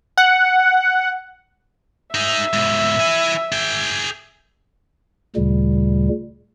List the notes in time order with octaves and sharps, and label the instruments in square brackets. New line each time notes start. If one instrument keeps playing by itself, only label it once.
[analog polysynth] F#5
[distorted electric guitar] D#4 G#4 [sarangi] E5
[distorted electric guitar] G#2 B2
E4 G#5
G#4 G5
[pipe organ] D2 A#2 C#3 G3